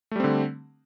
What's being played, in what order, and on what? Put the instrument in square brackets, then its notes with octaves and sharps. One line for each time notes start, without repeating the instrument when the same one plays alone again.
[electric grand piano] A3
G3
C4
D3